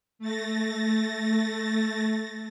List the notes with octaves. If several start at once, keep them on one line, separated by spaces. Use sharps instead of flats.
A3 A6 A#6